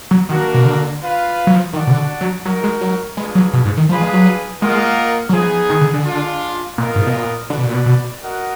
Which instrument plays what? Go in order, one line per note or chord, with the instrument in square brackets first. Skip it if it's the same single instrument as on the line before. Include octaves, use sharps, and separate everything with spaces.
[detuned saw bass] F#3
[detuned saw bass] D#3 [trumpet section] A#3 D4 F#4 A#4
[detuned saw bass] B2
D3
[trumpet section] F4 B4 F5
[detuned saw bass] F#3
F3
[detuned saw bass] D#3 [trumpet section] D4 F#4 D5 F#5
[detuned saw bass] B2
D3
F#3
[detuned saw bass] F#3 [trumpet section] D#4 F#4 A#4
[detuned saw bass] G#3
F#3
[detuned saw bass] G#3 [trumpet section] D4 F4 G#4 B4
[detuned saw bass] F#3
B2
G#2
D#3
[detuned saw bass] F3 [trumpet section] D4 G#4 B4 F5
[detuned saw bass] G#3
F#3
[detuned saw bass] G#3 [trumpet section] A#3 F4 A#4 D#5 F#5
[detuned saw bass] F#3
[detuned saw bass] F3 [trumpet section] B3 D#4 G#4
[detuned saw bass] D#3
D3
D3
[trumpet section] G#3 D4 F4
[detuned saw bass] A#2 [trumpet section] B3 F4 A#4 D#5
[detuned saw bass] G#2
B2
A#2
[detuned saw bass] D3 [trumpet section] F#4 B4 D5
[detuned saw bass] B2
A#2
B2
B2
[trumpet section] F#4 A#4 D#5 F#5